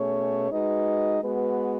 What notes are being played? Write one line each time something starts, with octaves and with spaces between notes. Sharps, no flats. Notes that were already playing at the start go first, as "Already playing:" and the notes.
Already playing: B2 A3 C#4 G#4 C#5
G#3 D#4 F#4 B4 D#5
G#3 B3 F#4 B4